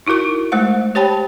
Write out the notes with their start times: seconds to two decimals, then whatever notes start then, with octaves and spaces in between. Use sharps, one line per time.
0.06 D#4 E4 F#4 A#4 C#6
0.52 G#3 A3 C5 E5 F#5
0.95 G4 C5 C#5 G5 A5 B5